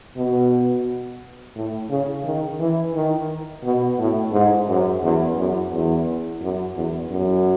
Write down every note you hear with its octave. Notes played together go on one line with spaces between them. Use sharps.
B2
A2
C#3
D#3
E3
D#3
B2
A2
G#2
F#2
E2
F#2
E2
F#2
E2
F#2